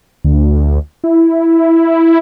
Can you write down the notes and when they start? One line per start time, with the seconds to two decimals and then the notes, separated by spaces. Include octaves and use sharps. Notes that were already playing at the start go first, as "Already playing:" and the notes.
0.24 D2
1.04 E4